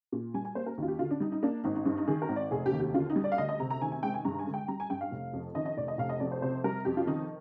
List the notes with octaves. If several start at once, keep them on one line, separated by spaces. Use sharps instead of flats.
A#2
G3 G#5
G#5
A#3 C5
A#4
D#2 F4
G4
D3 F4
D4
G3 D#4
D#4
A#3 D4
G#1 D#4
D#4
G2 D#4
D#4
D#3 G#4
A#4
G#1
D5
F1 G#4
G4
D#2
G4
D3 F4
D#4
G3
D5
F5
D2 D#5
D#5
C3 A#5
A#5
D#3 G#5
G#5
G#3 G5
G#5
G2 A#5
G#5
D3
G5
G3 A#5
G#5
G2 G5
F5
F1
F2
D#3 D#5
D#5
F1 D5
D#5
F1 F5
D#5
F2 D5
C5
C3 C5
G3 A#4
F2 G4
F4
D#3 D#4